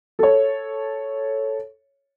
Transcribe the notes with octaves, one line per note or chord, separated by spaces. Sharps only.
A4 C#5